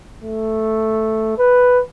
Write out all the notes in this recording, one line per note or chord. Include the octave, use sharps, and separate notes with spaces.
A3
B4